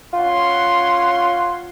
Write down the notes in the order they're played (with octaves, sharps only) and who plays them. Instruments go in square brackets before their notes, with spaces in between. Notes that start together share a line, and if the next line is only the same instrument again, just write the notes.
[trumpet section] C#4 F#5 C6 [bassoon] F4